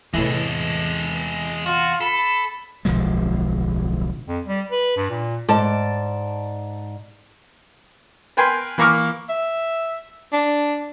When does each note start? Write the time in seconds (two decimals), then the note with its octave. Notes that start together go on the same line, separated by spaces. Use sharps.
0.14 E2 A2 C3 E3 G#3 A4
1.66 F4 F#4
2.01 A4 B5
2.85 D1 B1 F3 G#3
4.28 F2
4.46 G3
4.71 B4
4.97 G2
5.10 A#2
5.49 G#2 D5 A5
8.37 A#4 B4 G5 G#5 C6
8.78 E3 A#3 A#5 C#6 D6 F6
9.29 E5
10.33 D4